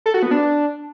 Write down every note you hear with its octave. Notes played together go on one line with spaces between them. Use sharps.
A4
F#4
B3
D4